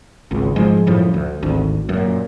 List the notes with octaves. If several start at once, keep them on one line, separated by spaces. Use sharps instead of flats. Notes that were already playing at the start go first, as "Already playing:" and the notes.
G#1 C#2
G#2 F3 G#3
F#2 A2 F3 G3
D2
G#1 D2
F#2 A#2